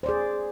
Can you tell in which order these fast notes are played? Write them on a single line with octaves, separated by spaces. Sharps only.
C5 D5 G#4